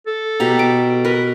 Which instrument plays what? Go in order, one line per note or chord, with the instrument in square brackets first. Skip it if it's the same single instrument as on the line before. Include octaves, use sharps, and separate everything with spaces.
[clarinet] A4
[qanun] B2 G4 A#5
D6
[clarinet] A#4 [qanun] B4